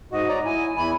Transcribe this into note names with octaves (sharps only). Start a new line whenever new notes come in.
G#2 F#4 D#5
C#5 D5 A#5
E4 G#5
E2 E3 G#5 B5